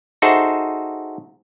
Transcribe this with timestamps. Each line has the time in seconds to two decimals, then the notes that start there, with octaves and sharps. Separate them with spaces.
0.22 D#4 F#4 G#4 A4 C5 E5